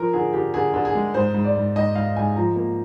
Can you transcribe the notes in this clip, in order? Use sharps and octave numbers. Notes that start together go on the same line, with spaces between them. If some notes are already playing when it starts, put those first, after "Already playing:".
Already playing: F3 A#4
D3 G#4
D3 G4
D3 G#4
D3
G#4
G#3
G#2 C5
G#2
D5
G#2
G#2 D#5
G#2 F5
G#2 G#5
F3 A#5
A#3